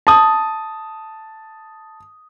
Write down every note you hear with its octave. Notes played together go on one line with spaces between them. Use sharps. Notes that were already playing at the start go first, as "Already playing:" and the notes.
A5 D#6